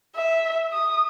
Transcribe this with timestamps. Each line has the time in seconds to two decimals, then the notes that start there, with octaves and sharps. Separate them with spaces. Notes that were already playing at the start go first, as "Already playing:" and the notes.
0.16 E5
0.73 D#6